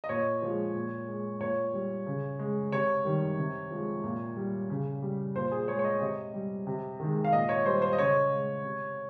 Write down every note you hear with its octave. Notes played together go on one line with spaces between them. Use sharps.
D#5
A#2 C#5
F3 G#3
A#2
G#3
A#2 C#5
G3
C#3
G#3
C3 C#5
D#3 G3
C3
F3 G#3
A#2
G3
C#3
G3
A#2 C5
G#4
G#3 C#5
C#5
D#5
C3 D#5
G3
C3
D#3 G#3
F5
A#2 D#5
C#5
G3 C5
C5
D#5
C#3 C#5
G#3
C3